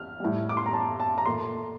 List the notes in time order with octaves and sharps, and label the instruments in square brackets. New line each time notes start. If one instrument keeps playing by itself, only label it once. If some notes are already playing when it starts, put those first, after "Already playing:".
Already playing: [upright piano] F6
A2 G3
D6
C6
A#5
A5
A5
A#5
A#2 A3 C6